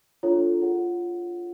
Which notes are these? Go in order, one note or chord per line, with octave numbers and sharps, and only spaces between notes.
D4 F4 A4 C#5
F4 G#4 C#5 F#5